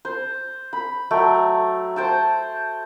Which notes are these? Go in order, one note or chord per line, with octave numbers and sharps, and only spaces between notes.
C5
B5
F#3 A3 C#5 G5
C5 G5 A5